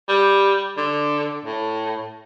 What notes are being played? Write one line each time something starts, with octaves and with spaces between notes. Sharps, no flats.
G3
D3
A2